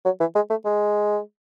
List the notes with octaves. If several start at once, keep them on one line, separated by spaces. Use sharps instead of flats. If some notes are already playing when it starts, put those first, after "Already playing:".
F#3
E3
G#3
A3
G#3